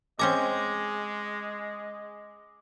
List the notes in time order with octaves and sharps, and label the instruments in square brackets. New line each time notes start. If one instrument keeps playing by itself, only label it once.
[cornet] G#3 [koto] C4 C#4 A#5 [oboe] D#5 [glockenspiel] D6